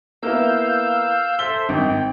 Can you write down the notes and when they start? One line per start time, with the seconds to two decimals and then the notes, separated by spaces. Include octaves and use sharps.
0.23 A#3 B3 E4 F5 E6 G6
1.39 A4 C5 E5 G7
1.69 G#1 G5